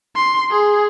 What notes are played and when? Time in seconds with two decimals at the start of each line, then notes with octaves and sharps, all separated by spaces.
0.15 C6
0.51 G#4